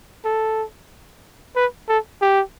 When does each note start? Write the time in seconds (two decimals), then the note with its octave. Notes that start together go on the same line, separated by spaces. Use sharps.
0.25 A4
1.56 B4
1.88 A4
2.22 G4